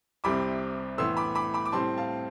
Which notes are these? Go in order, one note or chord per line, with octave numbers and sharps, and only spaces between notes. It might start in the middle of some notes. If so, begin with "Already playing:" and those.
C2 C3 G3 C4 B5 D6
A2 E3 B3 C6 E6
B5 D6
B5 D6
B5 D6
D6
A2 G3 C4 A5 C6
F5 A5